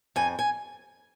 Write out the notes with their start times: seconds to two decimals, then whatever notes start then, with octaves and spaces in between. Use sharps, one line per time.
0.16 F2 G#5
0.39 G#5